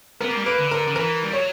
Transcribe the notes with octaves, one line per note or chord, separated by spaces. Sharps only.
B3 A#4
A#3
G3
A#3 B4
D3
A#4
D3
E3 A#4
G3
F#3 C#5